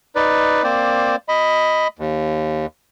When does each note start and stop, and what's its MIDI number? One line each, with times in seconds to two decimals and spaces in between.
0.16 0.63 63
0.16 0.63 71
0.16 0.63 74
0.64 1.16 58
0.64 1.16 60
0.64 1.16 72
0.64 1.16 74
1.29 1.88 75
1.29 1.88 83
1.99 2.66 39